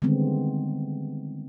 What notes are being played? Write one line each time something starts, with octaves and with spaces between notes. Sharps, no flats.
D3 D#3 G3 G#3 B3 C4